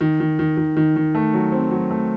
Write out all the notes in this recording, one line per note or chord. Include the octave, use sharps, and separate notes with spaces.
D#3
D#3
D#3
D#3
D#3
D#3
A3
F#3
C4
F#3
A3